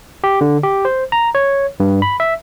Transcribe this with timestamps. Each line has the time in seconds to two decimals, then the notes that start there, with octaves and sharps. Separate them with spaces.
0.24 G4
0.41 D3
0.64 G4
0.85 C5
1.12 A#5
1.35 C#5
1.80 G2
2.02 B5
2.20 E5